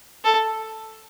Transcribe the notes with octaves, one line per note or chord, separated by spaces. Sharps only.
A4